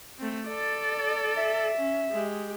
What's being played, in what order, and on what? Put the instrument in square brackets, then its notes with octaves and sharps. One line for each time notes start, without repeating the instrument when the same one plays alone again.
[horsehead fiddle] A3 C4
A4 D5
[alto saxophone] E5
[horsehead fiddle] C#4
G#3 G4